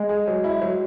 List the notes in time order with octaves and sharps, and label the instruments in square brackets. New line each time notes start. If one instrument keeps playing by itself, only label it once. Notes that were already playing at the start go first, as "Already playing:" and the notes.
Already playing: [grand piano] G#3
[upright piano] G#4
F#3
E4
F#3